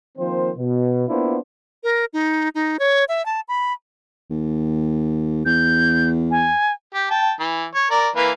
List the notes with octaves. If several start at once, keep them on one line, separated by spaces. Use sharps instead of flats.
D#3 F3 A#3 C4 C5
B2
A#3 B3 D4 E4 F4 C5
A#4
D#4
D#4
C#5
E5
A5
B5
D#2
E2 G6
G#5
G4
G5 A5
E3
C#5
A#4 D5
E3 A#3 B4